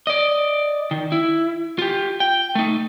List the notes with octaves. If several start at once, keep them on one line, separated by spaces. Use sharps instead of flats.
D5 D#5
D#3
E4
F4 G4
G5
A3 D#4